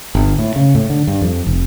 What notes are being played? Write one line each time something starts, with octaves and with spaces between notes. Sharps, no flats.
G1
A2
C#3
A2
D3
G2
F2
F1